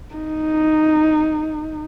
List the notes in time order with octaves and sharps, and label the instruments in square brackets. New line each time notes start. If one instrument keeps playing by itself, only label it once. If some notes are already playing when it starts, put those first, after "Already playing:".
[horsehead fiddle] D#4